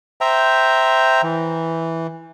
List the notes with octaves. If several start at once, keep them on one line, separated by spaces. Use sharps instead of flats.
C5 E5 G5 A#5
E3